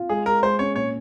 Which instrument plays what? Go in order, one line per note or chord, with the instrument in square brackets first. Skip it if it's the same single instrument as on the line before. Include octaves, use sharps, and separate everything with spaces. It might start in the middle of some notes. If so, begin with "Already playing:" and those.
Already playing: [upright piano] F4
[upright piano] G#3 [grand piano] G#4
[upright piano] G#3 [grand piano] A#4
[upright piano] G#3 [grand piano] C5
[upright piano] C#4 [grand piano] C#5
[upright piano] A#2 [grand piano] C#5